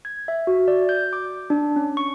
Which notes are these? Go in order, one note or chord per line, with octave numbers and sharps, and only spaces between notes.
G#6
E5
F#4
D5
G6
D6
D4
C#4
C#6